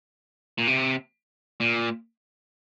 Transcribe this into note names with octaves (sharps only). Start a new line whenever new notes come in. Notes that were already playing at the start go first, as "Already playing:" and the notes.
A#2
C3
A#2